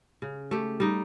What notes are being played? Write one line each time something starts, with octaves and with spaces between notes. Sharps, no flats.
C#3
A3 G4
G3 D#4